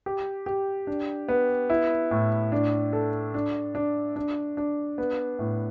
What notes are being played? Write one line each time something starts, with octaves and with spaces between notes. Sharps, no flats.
G4
G4
D4
B3
E4
A2
D4
A4
D4
D4
D4
D4
B3
A2